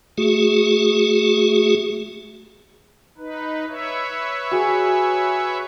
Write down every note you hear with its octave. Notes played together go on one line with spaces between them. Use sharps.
A3 F#4 G#4
D#4 B4
B4 C#5 E5
F#4 G#4 G#5